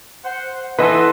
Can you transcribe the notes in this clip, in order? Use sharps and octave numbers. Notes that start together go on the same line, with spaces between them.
C5 F#5
E3 B3 A4 B4 D#5 E5 C6